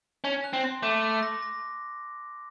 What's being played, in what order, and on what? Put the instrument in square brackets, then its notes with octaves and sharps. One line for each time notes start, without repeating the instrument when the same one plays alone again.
[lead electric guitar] C#4 [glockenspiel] A5
[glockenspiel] F#6
[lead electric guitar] C4
[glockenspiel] C6
[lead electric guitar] A3 [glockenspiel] D6
[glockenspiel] D6
A#6
A#6